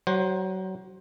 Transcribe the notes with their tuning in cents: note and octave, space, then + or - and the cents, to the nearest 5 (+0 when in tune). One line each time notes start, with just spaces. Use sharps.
F#3 +30 C5 +20 F#5 -5